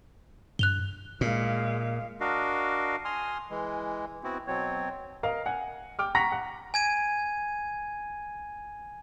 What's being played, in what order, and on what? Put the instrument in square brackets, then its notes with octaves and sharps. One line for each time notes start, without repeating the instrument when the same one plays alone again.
[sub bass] G2 [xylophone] F#6 F7 G7
[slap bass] A#2 [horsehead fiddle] G#3 F5
[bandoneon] D4 F#4 A#4 D#5 F5
G#5 C6 D#6 F6
E3 G#3
B3 C4 E4 F#4
B2 F#3 C4 C#5
[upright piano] A#4 D#5 F5
F#5 G#5
G5 D6 F6
F#5 A#5 C#6 A#6 B6
F#5
[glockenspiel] G#5 G#6 D#7